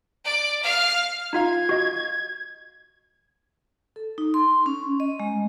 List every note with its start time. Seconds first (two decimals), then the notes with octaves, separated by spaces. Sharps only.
0.25 D5
0.63 F5
1.33 D#4 F4 F5 G#6
1.69 F#4 D#5
3.96 A4
4.18 D#4
4.34 C6
4.66 C#4
5.00 D#5
5.20 G#3